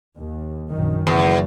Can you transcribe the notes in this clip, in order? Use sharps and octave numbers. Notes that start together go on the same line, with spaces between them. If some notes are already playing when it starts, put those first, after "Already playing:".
D#2
A#1 F#2 D#3
F#1 E2